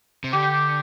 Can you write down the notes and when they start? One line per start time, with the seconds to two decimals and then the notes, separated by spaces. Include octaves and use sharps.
0.24 C3
0.33 D3 G4